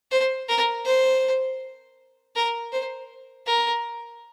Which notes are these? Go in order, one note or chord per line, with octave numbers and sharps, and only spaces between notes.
C5
A#4
C5
A#4
C5
A#4